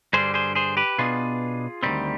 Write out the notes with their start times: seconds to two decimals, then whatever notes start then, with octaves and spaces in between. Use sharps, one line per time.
0.13 G2 D3 G3 G#4 C5
0.34 G#4 C5
0.55 G#4 C5
0.77 G4 B4
0.98 B2 B3 D4 F4 G#4
1.83 D2 C3 D#3 G3 C4